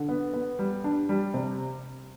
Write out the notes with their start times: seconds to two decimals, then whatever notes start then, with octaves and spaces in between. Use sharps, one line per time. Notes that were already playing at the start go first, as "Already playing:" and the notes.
Already playing: D3
0.09 B3
0.34 B3
0.59 G3
0.84 D4
1.09 G3
1.34 C3